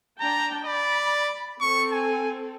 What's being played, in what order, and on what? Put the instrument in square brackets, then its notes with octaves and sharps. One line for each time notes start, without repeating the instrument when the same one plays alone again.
[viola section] D4 G5 A5 [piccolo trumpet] A#5
[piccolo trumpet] D5 [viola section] B5
[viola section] C4 A4 [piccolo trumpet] C#6
[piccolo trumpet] G#5